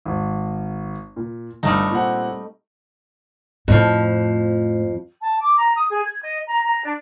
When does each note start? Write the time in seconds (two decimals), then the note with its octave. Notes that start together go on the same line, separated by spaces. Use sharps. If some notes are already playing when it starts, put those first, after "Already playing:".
0.05 G#1
1.16 A#2
1.63 G1 G3 A3 D#4
1.91 A#2 C4 F#5
3.68 F2 A2 F3
5.22 A5
5.40 D6
5.57 A#5
5.76 D#6
5.90 G#4
6.04 G#6
6.23 D#5
6.48 A#5
6.65 A#5
6.84 D4